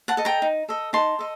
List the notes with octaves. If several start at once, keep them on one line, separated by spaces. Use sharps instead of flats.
F#5 A5
A4 D#5
G5 A#5
D#4
A4 D#5
D#4 A5 C6
A4 D#5